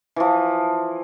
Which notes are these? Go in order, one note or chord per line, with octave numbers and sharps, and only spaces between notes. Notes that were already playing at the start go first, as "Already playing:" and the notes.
E3 F3